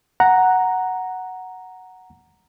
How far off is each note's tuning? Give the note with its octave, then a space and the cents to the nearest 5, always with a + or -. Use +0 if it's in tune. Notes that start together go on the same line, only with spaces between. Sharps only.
F#5 +0 A#5 +0